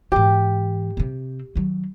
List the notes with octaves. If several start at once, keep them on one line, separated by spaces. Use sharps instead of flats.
G#2 E3 G4
C3 C4
D#3 F#3